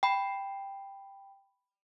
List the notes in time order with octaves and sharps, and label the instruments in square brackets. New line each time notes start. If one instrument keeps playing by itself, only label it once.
[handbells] G5 B5